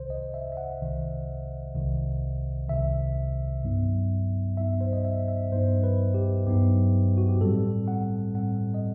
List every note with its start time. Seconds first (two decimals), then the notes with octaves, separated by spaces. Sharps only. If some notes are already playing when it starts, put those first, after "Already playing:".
Already playing: C2 C3 D#3 C5
0.10 D#5
0.34 E5
0.52 E5
0.57 F#5
0.81 C2 C3 D#3
1.74 C2 C3 D#3
2.69 C2 C3 D#3 E5
3.63 G2 F#3 B3 D#4
4.57 G2 F#3 B3 D#4 E5
4.81 C5
4.93 D#5
5.05 E5
5.28 E5
5.52 G2 F#3 B3 D#4 C5
5.84 B4
6.14 G4
6.47 G2 F#3 B3 D#4 G4
7.18 F#4
7.29 G4
7.41 A2 G3 C4 A4
7.88 F#5
8.35 A2 G3 C4 F#5
8.74 D#5